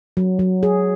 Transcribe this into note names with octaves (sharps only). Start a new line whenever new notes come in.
F#3
F#3
G#4